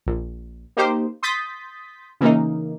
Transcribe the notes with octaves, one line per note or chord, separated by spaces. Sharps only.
A#1
A#3 D#4 G4 C5
C6 D#6 G6 A6 B6
C#3 E3 A#3 D#4